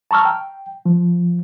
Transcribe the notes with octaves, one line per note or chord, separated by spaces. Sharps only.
A5 A#5 C#6 E6 F6
G5
F3